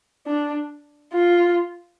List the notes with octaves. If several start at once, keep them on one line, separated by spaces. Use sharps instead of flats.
D4
F4